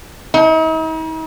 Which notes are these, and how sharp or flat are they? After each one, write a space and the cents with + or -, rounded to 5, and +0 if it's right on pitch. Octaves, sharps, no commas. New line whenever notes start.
D#4 +45